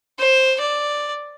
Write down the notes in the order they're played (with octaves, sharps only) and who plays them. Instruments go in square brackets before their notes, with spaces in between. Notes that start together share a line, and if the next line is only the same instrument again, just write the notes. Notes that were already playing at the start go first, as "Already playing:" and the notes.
[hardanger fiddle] C5
D5